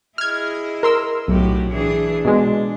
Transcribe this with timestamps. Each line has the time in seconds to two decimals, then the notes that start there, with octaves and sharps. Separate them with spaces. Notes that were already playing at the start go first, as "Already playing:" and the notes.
0.18 E4 G#4 D#5 F6 G#6
0.83 A#4 C6 E6
1.28 B1 A2 F#4 G4
1.70 E3 D4 G#4
2.25 B2 G#3 D4